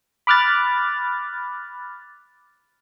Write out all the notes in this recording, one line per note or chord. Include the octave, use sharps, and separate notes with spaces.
B5 D6 F6 F#6 A6